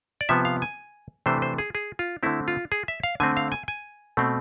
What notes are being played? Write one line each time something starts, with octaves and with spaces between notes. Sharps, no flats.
D5
C3 F3 B3 E5
F5
G#5
C3 E3 A3 D4 C5
C5
G#4
G#4
F4
D3 A3 C4 E4
F4
G#4
E5
F5
D3 A3 C4 G#5
F5
G#5
G#5
B2 A3 C4